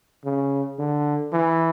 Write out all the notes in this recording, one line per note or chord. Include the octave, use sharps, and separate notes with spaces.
C#3
D3
E3